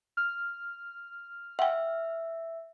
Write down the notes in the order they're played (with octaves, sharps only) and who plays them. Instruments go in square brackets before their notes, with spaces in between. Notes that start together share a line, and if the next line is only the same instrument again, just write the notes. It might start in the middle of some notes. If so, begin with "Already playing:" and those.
[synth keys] F6
[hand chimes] E5 [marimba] F#5 G5